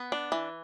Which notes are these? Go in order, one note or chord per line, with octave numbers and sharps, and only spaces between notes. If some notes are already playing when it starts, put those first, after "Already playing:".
Already playing: B3
D4
E3